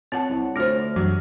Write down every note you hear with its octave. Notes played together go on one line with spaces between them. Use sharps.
C4 F4 C#5 F#5 A5
C2
D2 F4 C5 F6 A#6
F#2 E3 F#3 G3